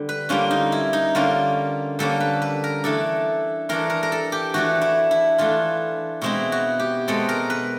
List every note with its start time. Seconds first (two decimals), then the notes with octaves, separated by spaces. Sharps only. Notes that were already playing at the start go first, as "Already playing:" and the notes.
Already playing: D3 G3
0.09 B4
0.29 D3 G3 A#3 C#4 F4
0.51 D#4
0.72 E4
0.93 D#4
1.15 D3 G3 A#3 C#4 F4
1.99 D3 G3 A#3 C#4 A4
2.20 B4
2.42 B4
2.64 A#4
2.84 E3 A3 D4 A4
3.69 E3 A3 D4 A#4
3.90 A#4
4.03 A#4
4.12 A4
4.32 G4
4.54 E3 A3 D4 F#4
4.81 E4
5.11 E4
5.38 E3 A3 D4 F4
6.22 B2 G#3 C4 E4
6.52 F#4
6.80 G4
7.08 B2 G#3 C4 A4
7.29 A#4
7.50 B4